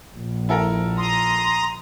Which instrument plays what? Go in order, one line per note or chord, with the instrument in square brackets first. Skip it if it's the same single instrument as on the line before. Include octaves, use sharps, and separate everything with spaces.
[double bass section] A#1
[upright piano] E4 A4 A#4
[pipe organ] A#5 D#6 [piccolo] C6